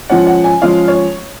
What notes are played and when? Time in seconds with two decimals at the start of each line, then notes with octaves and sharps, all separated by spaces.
0.10 F3 G#3 C#4 F#5
0.27 F#5
0.44 G#5
0.62 F3 G#3 C#4 F5
0.88 C#5